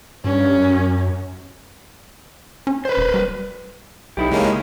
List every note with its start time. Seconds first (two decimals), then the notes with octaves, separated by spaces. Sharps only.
0.24 G2 C#4
0.57 F#2
2.67 C#4
2.85 B4 C5
2.98 E1
3.14 G3
4.17 B1 D#4 E4 G4
4.31 C#3 G#3 A#3 C#4